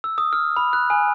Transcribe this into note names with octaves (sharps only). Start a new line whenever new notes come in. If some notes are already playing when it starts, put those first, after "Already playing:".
E6
D#6
F6
B5
F#6
G#5